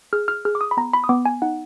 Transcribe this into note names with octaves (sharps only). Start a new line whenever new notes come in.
G#4 F6
F6
G#4 F6
D6
D#6
B5
B3 A#5
B5
D#6
B3 D6
G#5
D#4 F#5